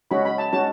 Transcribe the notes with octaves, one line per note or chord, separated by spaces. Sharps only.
G#3 C#4 F#4 B5
B5
A5
G#3 C#4 F#4 A5